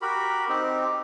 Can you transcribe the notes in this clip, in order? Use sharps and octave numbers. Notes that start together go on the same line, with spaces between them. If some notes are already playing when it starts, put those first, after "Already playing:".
F#4 G4 A#4 B5
C4 D#4 G4